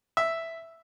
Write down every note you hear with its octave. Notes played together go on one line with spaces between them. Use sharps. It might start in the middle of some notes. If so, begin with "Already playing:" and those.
E5